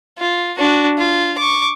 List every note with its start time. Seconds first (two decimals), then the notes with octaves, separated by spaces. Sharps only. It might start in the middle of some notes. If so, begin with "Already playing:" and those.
0.18 F4
0.58 D4 F#4
0.98 F4
1.38 C#6 D6